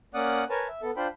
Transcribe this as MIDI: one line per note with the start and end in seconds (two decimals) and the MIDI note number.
0.14 0.44 58
0.14 0.44 61
0.14 0.44 74
0.14 0.44 78
0.14 0.44 87
0.14 0.44 90
0.50 0.68 70
0.50 0.68 71
0.50 0.68 73
0.50 0.68 80
0.50 0.68 81
0.68 0.82 76
0.82 0.91 59
0.82 0.91 69
0.97 1.07 62
0.97 1.07 65
0.97 1.07 72
0.97 1.07 79
0.97 1.07 83